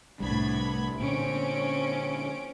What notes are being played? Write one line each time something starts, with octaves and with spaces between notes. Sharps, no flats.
C2 A2 G3 B3 D4 B5 G#6
A#2 D3 C4 C#4 D7